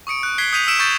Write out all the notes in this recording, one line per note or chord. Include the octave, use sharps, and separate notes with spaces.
C#6 D#6 C#7 D7
F#6
F#6 G#6 B6 C7 G7
D#6 G6 B6 D#7 F7
E6 B6 C#7 D7 E7
C#6 G6 A6